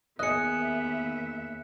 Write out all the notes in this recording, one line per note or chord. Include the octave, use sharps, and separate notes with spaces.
D#2 B3 G#4 D#5 E5 F#6 C#7